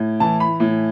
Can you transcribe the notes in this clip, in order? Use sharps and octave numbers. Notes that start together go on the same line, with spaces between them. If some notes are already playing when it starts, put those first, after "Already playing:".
Already playing: A2
E3 A5
B5
A2